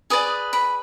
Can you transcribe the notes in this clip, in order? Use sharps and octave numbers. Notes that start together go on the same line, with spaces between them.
G#4 B4 D5 D#6
B5